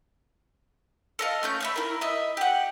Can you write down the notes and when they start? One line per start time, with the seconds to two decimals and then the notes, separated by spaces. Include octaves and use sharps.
1.19 A4 D#5 F5
1.43 A3 C#4 G6
1.60 C#5 E5 B5
1.76 E4 A#4
2.01 D#5 E5
2.37 G4 F#5